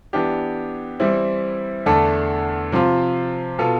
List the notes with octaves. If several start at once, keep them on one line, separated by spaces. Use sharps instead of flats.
E3 B3 D4 G4
E3 G3 C4 E4
E2 D3 A3 D4 A4
C3 F3 C4 F4
B2 B3 F4 A4